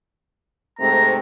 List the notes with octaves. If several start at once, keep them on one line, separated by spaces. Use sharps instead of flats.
G#2 C3 A3 A#5